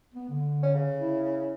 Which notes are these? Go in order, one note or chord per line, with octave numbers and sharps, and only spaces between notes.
B3
D3
C#4
C#3
E4